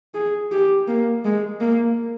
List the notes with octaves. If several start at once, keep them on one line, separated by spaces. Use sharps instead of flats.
G#4
G4
A#3
G#3
A#3